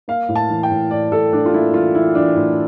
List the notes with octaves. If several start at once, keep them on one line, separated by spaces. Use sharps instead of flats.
A#3 F5
A2
A5
E3
G5
A2
A2 D5
A2 A4
A2 D4
F4
A#3 E4
E3 F4
E3 E4
E3 D4
A2 E4